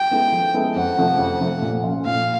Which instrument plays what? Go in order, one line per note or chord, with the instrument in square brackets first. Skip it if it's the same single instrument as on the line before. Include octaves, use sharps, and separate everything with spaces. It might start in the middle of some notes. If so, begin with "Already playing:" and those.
Already playing: [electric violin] G5
[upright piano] G#3 B3 E4 A4
F3
G#3 B3 E4 A4
[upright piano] F2 [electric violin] F#5
[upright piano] C3 F3 A3
F2
C3 F3 A3
A#2
F3 A3 C#4 F4
[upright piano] A#2 [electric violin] F5